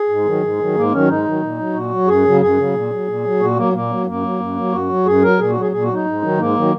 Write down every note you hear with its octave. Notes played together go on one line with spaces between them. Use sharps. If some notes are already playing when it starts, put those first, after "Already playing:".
Already playing: G#4
G#2
D#3 F#3
G#2
D#3 F#3
G#2 A#3
D#3 F#3 C#4
G#2 D#4
D#3 F#3
A#2
F#3
A#2 F#4
F#3
F#2 G#4
C#3 F#3
F#2 G#4
C#3 F#3
A#2
F#3
A#2
F#3
A#2 F#4
F#3 A#3
A#2 A#3
F#3
F#2 A#3
F#3
F#2
F#3
F#2 F#4
F#3
F#2 G#4
F#3 A#4
A#2 G#4
F#4
F#3
G#4
A#2 G#4
F#4
F#3
D#4
G#2
D#3 F#3
G#2 A#3
D#3 F#3